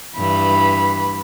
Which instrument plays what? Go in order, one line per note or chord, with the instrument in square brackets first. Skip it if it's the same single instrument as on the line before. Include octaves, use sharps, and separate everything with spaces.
[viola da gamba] G2 E3 [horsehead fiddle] B5